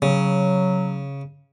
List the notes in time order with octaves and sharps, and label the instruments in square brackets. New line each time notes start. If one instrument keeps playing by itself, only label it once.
[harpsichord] C#3 [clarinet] F#3